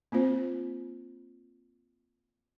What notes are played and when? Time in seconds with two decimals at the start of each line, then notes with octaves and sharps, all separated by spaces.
0.12 A#3 C4 F4 C5